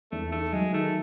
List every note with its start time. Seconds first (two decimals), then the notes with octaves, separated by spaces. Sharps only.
0.12 E2 A3
0.32 A3 D#4
0.53 F#3 G#3
0.73 D#3 A3